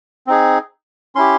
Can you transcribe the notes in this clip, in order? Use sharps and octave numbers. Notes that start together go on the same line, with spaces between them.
C4 D#4 G#4
C#4 E4 G4 C6